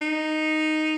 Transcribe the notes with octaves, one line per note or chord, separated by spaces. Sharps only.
D#4